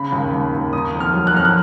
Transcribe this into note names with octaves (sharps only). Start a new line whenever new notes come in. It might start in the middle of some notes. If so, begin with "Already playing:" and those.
Already playing: C#3 B5
D#2
D#2
D#2
D#3 D#6
F2
F6
F#3
F#6
F2 F6
F#6